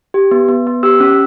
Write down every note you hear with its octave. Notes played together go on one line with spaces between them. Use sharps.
G4
B3
B3
B3
G4 E6
C#4